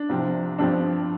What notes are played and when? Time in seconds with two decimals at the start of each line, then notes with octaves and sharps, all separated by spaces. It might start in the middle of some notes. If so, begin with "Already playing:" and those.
Already playing: D4
0.09 C2 C3 F3 C4
0.58 G2 F3 C4 D4